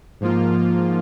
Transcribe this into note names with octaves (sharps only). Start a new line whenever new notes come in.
G#2 F3 A#3 F4